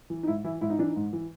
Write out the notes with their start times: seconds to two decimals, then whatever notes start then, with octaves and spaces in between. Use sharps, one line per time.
0.10 E3
0.23 D#4
0.27 G#2 E4
0.44 E3 E4
0.61 G#2 E4
0.70 D#4
0.78 E3 D4
0.88 D#4
0.96 G#2
1.13 E3